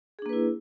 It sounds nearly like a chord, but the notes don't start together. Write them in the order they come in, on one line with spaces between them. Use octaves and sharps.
G#4 D4 A#3 B4 E4